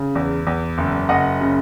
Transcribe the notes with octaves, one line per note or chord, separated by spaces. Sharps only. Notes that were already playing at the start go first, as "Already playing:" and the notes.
Already playing: C#3
E2
E2
F#1
F#1 D#5 F#5
C#3